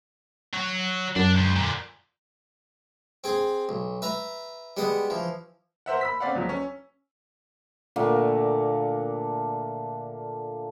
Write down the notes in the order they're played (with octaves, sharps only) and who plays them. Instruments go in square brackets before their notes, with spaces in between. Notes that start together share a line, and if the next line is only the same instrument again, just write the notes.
[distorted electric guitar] F#3
[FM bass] F#2 [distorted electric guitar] D4
[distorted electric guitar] C#2
A#2 D3
[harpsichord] C4 G#4 G#5
B1
B4 E5 A#5
G3 G#3 B3 F#5 D#6
E3 F3
[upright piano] A#4 C5 E5 F#5
B5 E6 B6
C4 C#4 D5 F5 F#5
C#2 F3 F#3
C#4
[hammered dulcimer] A#2 D3 A3 A#3